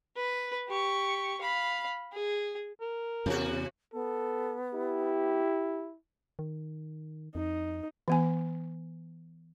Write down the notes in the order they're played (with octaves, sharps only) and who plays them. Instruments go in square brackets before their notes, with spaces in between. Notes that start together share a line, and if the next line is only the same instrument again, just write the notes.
[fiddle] B4
G4 C#6
F5 B5
G#4
[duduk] A#4
[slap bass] E2 [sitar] C3 F#4
[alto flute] B3 [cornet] A4
[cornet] E4 [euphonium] G4
[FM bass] D#3
[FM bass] F2 [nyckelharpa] D#4
[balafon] E3 B3 G#5